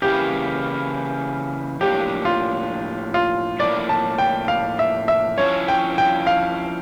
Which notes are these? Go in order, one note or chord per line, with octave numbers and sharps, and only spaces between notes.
C#3 E3 A#3 E4 G4
A2 F3 A#3 D4 G4
F4
F4
A2 F3 A#3 E4 D5
A5
G5
F5
E5
E5
F3 C#4 E4 C#5
G5
G5
F5